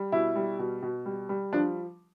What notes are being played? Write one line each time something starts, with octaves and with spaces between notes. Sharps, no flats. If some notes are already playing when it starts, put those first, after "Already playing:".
Already playing: G3
B2 E4
G3
B2
B2
G3
G3
F3 D4